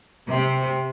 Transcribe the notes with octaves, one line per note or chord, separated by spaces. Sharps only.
C3